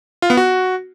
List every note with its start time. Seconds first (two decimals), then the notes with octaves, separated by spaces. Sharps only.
0.22 F4
0.30 B3
0.37 F#4